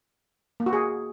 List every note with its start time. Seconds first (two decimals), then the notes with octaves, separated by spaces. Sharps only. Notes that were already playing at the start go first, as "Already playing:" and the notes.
0.60 A#3
0.66 F#4
0.73 G#4